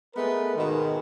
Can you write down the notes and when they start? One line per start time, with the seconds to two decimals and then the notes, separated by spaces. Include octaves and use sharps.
0.15 G#3 A3 B3 A#4 B4
0.56 G#2 B2 D#3